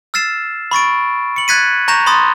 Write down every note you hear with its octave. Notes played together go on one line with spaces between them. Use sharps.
E6 F6 A6 C7 E7
B5 C#6 A6 D7
C#7 F#7
F#6 G#6 A6 B6 C#7 D#7
A#5 C#6 G6 A#6 E7 F7
B5 C6 D#6 A6